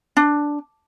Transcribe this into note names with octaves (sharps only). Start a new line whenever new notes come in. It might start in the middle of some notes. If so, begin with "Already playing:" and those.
D4